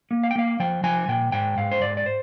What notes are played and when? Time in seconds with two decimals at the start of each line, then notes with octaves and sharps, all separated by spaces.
0.11 A#3
0.23 F5
0.31 G5
0.36 A#3 F5
0.60 F3 G5
0.84 F3 G#5
1.08 A#2 G5
1.32 G#2 G5
1.58 G#2 F5
1.71 C5
1.82 G#2 D5
1.97 D5
2.06 C5